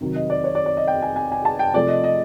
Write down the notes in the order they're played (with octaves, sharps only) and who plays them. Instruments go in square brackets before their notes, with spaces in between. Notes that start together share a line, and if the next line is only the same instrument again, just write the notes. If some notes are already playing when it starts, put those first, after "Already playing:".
[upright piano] C3 D#3 F#3
D#5
D5
C#5
D5
D5
D#5
G5
G#5
G#5
G#5
A5
G5
C3 F3 A3 D5
D#5
D#5